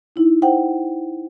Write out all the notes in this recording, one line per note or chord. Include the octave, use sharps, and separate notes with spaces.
D#4 E4
C5 F#5 G5